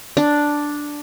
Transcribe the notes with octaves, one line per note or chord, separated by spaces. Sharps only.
D4